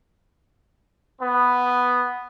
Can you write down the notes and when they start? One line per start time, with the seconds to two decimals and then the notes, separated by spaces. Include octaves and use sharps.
1.21 B3